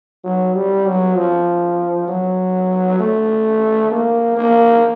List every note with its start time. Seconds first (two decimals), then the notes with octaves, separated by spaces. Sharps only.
0.25 F#3
0.55 G3
0.86 F#3
1.16 F3
2.08 F#3
3.00 A3
3.91 A#3
4.37 A#3